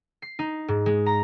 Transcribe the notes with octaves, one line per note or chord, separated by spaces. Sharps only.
C7
D#4
G#2
G#3
A#5